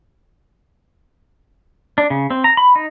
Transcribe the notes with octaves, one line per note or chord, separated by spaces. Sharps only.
D4
C#3
C4
A#5
B5
D#4